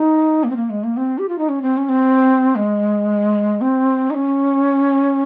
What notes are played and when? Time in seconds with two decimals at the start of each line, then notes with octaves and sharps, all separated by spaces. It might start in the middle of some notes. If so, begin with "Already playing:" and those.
Already playing: D#4
0.44 A#3
0.50 C4
0.56 A#3
0.70 G#3
0.84 A#3
0.97 C4
1.18 G4
1.29 F4
1.39 D#4
1.49 C#4
1.62 C4
1.77 C#4
1.89 C4
2.56 G#3
3.61 C4
4.10 D#4
4.14 C#4